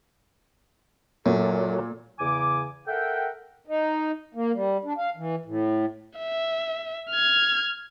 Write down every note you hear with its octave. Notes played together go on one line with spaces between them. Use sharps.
F#2 A#2 F#3 A4
E2 C#3 G#5 D6
A4 A#4 E5 F#5 G5
D#4
A#3
G3
D4
F5
E3
A2
E5
F6 G#6